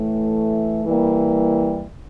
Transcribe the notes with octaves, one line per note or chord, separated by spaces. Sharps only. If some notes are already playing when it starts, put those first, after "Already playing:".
Already playing: A2 E3 A3
E3 G3 A#3